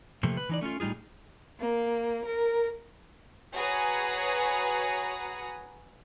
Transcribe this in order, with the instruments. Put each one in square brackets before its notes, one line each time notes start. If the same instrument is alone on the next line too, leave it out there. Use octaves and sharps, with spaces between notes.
[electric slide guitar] C3 F3 A3 A#3
B4
E3 D#4 D5
A3 C#4 D#4 F4
A2 G3 D#4 F4 G#4
[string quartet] A#3
A#4
[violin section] F#4 G#4 B4 C#5 A#5 D#6